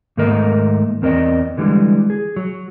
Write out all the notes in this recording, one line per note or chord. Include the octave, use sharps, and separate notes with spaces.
G#2 D#3 A3 A#3 A#4 D#5
E2 C4 A#4 D5 D#5
D3 E3 G3 G#3
G#4
F#3